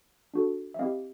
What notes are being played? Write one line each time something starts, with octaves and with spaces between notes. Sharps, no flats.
D4 F#4 A4
E5
C4 E4 G4 D#5 F5